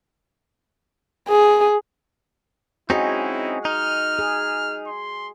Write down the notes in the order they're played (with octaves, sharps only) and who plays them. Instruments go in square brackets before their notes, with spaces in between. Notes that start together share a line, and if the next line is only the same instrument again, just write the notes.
[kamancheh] G#4
[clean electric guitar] C4 C#4 D#4 [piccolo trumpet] E4 [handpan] F#4 G#4 D#5
[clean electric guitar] D#4 [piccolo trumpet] F6
[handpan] G#4
[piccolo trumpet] C6